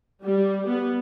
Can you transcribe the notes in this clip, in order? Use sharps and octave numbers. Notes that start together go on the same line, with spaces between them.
G3
B3